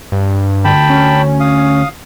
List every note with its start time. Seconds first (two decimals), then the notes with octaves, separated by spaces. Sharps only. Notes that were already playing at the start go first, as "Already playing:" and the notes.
0.12 G2
0.65 D2 G5 A5 B5
0.90 C#4
1.40 F5 D#6